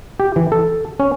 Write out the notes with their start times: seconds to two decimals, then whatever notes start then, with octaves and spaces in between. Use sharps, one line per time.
0.20 G4
0.36 E3
0.52 A4
1.00 C#4